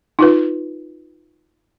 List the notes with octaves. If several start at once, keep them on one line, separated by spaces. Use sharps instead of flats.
D#4 F4 B4